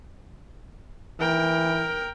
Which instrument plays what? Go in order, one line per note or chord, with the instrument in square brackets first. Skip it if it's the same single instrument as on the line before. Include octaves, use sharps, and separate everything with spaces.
[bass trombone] E3 [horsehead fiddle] A#4 G5